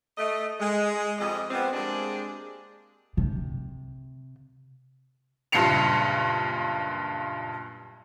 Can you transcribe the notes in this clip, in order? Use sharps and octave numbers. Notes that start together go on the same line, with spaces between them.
A3 D#5
G#3
F2 G3 G#3 D#5
F3 G3 B3 C4
G#3 A#3 C4 D4 G4 G#4
C3
F#1 G2 A#2 C7 C#7 F7